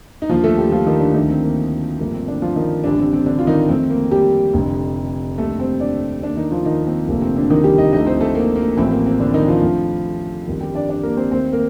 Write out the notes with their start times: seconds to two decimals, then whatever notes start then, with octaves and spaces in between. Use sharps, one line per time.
0.22 D#4
0.29 D#2 D3 F3 F4
0.44 A3 A4
0.58 G3 G4
0.72 F3 F4
0.86 D#3 D#4
1.00 D3 D4
1.14 D2 D3 D#3 F3 A3 D#4
1.29 C4
1.43 A#3
1.99 G1 G2 D3 F3 A3 A#3
2.14 C4
2.27 D3 D4
2.42 F3 F4
2.56 D#3 D#4
2.84 A1 G2 D3 G3 D4
2.99 C4
3.13 C4
3.26 D3 D4
3.39 F4
3.47 D#3 D#4
3.69 F2 D#3 A3 C4
3.90 A#3
4.11 G3 G4
4.54 F1 F2 D3
5.38 F1 D#2 D3 G3 A3 A4
5.60 C4 C5
5.80 D4 D5
6.23 D#2 D#3 A3 D4 D5
6.37 D#3 D#4
6.51 F3 F4
6.66 D#3 D#4
6.82 A#3
6.87 C4
7.08 F1 D#2 D3 F3 A3 A#3
7.22 C4
7.36 D3 D4
7.50 D#3 D#4
7.64 G3 G4
7.78 D#4 D#5
7.93 D2 D3 F3 A3 D#4 D#5
8.07 C4 C5
8.21 A3 A4
8.35 A#3
8.56 A#3
8.77 A1 A2 F3 A3 C4
8.91 A#3
9.06 C4
9.20 D3 D4
9.34 D#3 D#4
9.48 F3 F4
9.62 F2 D3 A3
10.47 G1 F2 D#3 G3
10.61 G3 G4
10.75 D4 D5
10.89 D4 D5
11.03 A#3 A#4
11.17 C4 C5
11.31 D#2 D#3 A3 C4 C5
11.52 A#3 A#4